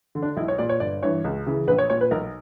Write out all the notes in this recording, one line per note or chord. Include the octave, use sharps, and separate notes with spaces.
D3
D4
B1 E4
C#5
A#2 D5
C#5
G1 D5
G2 E3 C#5
C#2
C#3 E3
A#1 B4
C#5
A#2 C#5
B4
B1 A#4